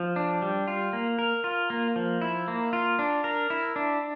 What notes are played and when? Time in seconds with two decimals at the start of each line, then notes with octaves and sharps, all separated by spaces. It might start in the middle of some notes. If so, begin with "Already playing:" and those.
Already playing: F3
0.16 D4
0.42 G3
0.67 F4
0.93 A#3
1.19 A#4
1.44 F4
1.70 A#3
1.96 F3
2.21 E4
2.48 A#3
2.73 F4
2.99 D4
3.24 A#4
3.50 E4
3.76 D4